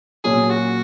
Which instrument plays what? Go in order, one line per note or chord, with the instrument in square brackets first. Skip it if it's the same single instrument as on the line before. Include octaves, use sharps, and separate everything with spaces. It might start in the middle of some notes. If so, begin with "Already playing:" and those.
[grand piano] A#2 F#3 C#4 F4 [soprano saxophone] G#4
[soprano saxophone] F#4